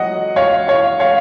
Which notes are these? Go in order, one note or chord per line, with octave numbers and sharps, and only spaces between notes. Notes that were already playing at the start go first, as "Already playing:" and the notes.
Already playing: F#3 D#5 F#5
C#5 F5
C#5 F5
C#5 F5